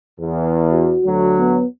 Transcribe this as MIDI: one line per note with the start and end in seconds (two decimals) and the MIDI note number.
0.20 0.95 40
0.73 1.32 66
1.05 1.59 38
1.05 1.59 54
1.39 1.66 59